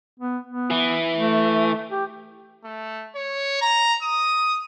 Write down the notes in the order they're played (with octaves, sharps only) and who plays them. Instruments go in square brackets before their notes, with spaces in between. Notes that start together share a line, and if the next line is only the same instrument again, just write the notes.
[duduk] B3
B3
[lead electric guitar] E3
[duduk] A3
G4
[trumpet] A3
C#5
A#5
D#6